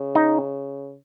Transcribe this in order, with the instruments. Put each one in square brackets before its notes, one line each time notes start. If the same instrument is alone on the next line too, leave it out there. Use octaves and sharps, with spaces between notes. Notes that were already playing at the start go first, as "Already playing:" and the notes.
Already playing: [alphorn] C#3
[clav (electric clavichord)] D#4